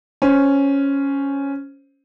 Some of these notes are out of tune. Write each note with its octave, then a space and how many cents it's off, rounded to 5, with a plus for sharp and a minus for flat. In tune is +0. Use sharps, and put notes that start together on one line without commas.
C#4 +0 C5 +5